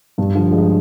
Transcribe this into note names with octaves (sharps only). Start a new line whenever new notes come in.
G2
D3 F3
F3 G#3